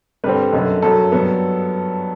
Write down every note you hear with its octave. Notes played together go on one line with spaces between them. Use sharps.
G2 D3 G3 C4 B4
F#1 F#2 D3
G1 F#2 F#3 A4
G2 F#3 B3